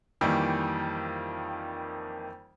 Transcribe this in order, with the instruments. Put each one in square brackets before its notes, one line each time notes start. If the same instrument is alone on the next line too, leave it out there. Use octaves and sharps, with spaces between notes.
[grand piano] F2 D#3 E3 G3 A#3